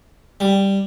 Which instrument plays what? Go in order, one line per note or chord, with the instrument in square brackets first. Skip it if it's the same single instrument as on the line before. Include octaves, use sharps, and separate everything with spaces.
[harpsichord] G3